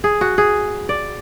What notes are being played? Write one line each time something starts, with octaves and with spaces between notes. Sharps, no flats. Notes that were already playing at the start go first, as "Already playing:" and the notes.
G#4
F#4
G#4
D5